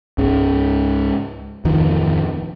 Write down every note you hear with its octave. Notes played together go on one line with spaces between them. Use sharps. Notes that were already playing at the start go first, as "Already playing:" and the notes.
C#2 G#2 C#3
D1 F2 D#3 F3